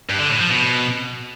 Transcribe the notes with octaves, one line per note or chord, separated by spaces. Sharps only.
G2
D3
A2
F3
B2